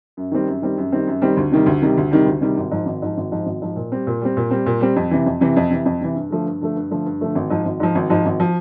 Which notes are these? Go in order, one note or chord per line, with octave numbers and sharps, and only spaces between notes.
F#2
D#3 G3 C4
F#2
D#3 G3 C4
F#2
D#3 G3 C4
F#2
D#3 G3 C4
D2
C3 D#3 G3
D2
C3 D#3 G3
D2
C3 D#3 G3
D2
C3 D#3 G3
G#1
G#2 F3
G#1
G#2 F3
G#1
G#2 F3
G#1
G#2 F3
A#2
G3 C4
A#2
G3 C4
A#2
G3 C4
A#2
G3 C4
F2
C3 E3
F2
C3 E3
F2
C3 E3
F2
C3 E3
G2
D3 F3 A3
G2
D3 F3 A3
G2
D3 F3 A3
G2
D3 F3 A3
G#1
G#2 F3
G#1
G#2 F3
G#1
G#2 F3
G#1
F3